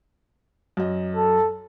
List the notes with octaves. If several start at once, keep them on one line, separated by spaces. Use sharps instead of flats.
F#2 D#5
A4